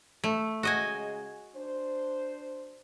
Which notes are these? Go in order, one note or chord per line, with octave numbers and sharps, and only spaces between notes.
A3
C#3 G#3 F#4 G#4 D#5 G#5
D4 C5